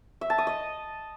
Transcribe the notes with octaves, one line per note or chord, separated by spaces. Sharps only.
E5
A5
D#6
D#5